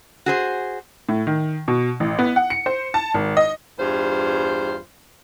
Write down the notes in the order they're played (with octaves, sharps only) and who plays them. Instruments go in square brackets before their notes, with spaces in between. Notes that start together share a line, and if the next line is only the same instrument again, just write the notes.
[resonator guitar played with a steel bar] F#4 G#4 C5
[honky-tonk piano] A2
D#3
B2
A1
B3
F#5
C#7
C5
A5
G#1
D#5
[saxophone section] E2 G2 F4 C5